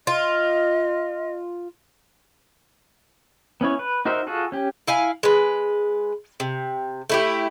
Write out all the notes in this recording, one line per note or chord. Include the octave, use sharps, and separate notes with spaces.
F4 D#5
B3 C#4 E4 C#5
B4
D#4 F#4 A#4 C5 E5
F4 F#4 G#4 A4
C#4 G4
E4 F5 G#5
G#3 B4
C3
A3 E4 G4